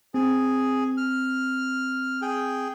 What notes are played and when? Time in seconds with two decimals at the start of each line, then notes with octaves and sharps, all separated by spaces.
0.14 C4 G#4
0.97 F6
2.22 G#4 G5